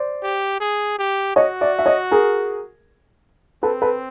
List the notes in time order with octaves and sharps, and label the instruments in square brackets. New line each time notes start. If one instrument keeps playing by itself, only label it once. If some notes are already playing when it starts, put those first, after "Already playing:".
Already playing: [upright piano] C5 D5
[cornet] G4
G#4
G4
[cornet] F#4 [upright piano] C#5 D#5
[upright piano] D5 E5
E5
C#5 D#5
G#4 A#4
[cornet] C4 [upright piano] A4 B4
[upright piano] A4 B4